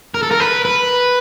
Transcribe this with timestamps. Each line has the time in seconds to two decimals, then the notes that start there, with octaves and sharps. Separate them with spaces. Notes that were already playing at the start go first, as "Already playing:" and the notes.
0.14 A#4
0.23 A4
0.31 A#4
0.40 B4
0.65 B4